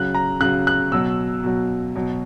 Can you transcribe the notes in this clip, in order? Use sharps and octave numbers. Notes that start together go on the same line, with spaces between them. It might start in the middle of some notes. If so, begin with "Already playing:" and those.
Already playing: C#3 F#3 F#6
A#5
C#3 F#3 F#6
F#6
B2 F#3 E6
B2 F#3
B2 F#3